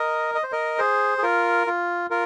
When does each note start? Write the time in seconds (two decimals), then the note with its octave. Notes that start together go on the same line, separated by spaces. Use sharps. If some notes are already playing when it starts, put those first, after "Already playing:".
Already playing: A#4 D#5
0.35 D#5
0.44 C5
0.52 A#4 D#5
0.78 G#4 C5
1.18 G#4
1.23 F4 A#4
1.67 F4
2.10 F4 A#4